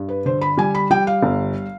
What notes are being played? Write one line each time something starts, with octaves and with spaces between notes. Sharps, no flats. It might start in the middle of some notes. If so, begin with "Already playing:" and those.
Already playing: G2
B4
D3 C5
B5
G3 G#5
B5
G3 G5
F5
G1